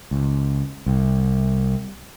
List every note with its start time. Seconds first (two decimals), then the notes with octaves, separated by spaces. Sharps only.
0.11 C#2
0.86 C2